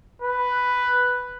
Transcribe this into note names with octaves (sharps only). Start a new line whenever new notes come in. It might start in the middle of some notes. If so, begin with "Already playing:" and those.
B4